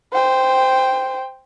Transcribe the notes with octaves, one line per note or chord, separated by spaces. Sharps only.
C5 G5